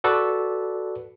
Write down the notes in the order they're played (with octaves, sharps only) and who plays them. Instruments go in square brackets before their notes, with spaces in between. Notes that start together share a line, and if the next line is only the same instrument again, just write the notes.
[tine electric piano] F#4 A4 B4 D5